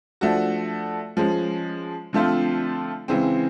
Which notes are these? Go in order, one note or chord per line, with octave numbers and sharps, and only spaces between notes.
F3 A3 D4 F#4
F3 G#3 C#4
D3 F3 A3 C4 F4
C#3 E3 G#3 C4